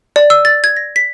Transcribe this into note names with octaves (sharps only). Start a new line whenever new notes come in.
D5
E6
A6
G#6
A#6
B6